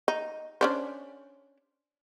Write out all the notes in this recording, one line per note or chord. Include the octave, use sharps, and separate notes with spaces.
D#4
C#4 D4 C5